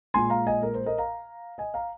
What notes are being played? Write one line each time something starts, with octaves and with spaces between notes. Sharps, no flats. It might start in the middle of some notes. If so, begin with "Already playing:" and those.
A#2 G#3 G#5 C6
F5 A#5
D#5 G#5
A#4
C5
A#4 D#5
F5 A#5
D#5 G#5
F5 A#5